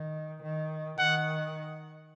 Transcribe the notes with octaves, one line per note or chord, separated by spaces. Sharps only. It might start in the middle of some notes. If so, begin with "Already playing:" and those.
Already playing: D#3
D#3
D#3 F#5